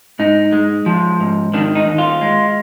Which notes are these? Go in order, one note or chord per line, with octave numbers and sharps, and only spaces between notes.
G#2 D#4
G#3
F3
G#2
D#3 D4
D#4
D#2
F4
G#3